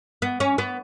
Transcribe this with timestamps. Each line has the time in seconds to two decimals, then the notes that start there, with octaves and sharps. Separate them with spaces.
0.22 B3
0.40 C#4
0.58 B3